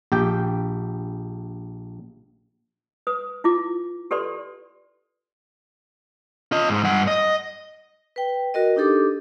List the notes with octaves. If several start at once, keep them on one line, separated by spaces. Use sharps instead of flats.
A#1 G4 G5
B4 D#6
E4 F4 D6
G4 A4 B4 D5 C6
F4 D#5
G#2
G2 F#5
D#5
B4 G5
F#4 A#4 D#5
D4 D#4 G4 A4 D6